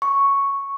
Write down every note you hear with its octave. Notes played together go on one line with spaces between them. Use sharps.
C#6